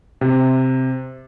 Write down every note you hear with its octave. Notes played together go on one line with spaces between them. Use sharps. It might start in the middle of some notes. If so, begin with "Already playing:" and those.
C3